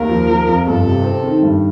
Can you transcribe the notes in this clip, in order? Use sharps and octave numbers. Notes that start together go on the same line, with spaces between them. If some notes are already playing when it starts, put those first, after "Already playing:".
Already playing: D#2 A#4
F3
F3
F2
G1 A4
C3
C4
D#3
G2